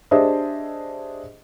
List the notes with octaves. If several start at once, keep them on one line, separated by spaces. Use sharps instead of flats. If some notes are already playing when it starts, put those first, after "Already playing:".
D4 G4 G#4 C5 D#5 E5